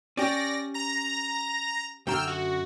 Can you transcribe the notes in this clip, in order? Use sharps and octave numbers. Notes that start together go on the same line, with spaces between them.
C#4 G4 D5 A#6
A#5 A#6
F#2 D3 G5 A#5 E6 F6
F#4